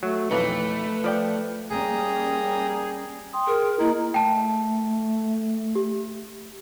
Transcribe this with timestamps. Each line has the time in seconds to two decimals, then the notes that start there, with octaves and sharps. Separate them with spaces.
0.03 F#3 A3
0.31 B1 F2 E3 A3 B4
1.04 F3 D5 G5
1.71 G3 A#3 C#4 G#4 G5 A#5 D#6
3.33 G5 C6 D#6
3.47 G#4 A#4
3.79 A#3 E4 D#5 A#5
4.14 A3 G5 A5
5.75 G4